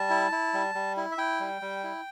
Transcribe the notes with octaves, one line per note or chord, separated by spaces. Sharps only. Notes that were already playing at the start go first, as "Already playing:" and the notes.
Already playing: G3 A5
E4
E4
G3
G3
E4
E5
E4 G5
G3
G3
E4